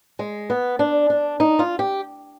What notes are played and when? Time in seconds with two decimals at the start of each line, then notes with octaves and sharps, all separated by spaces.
0.19 G#3
0.50 B3
0.79 D4
1.10 D4
1.40 D#4
1.59 F4
1.79 G4